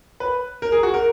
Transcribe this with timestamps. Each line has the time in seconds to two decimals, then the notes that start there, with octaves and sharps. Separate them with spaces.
0.20 B4
0.62 A#4
0.72 G#4
0.83 F#4
0.94 A#4